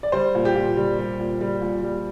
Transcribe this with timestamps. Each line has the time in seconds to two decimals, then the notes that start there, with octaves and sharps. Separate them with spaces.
0.03 D5
0.12 G3 C5
0.35 A#2
0.45 G4
0.55 A#2
0.77 G3
0.99 G3
1.20 A#2
1.41 G3
1.61 A#2
1.83 G3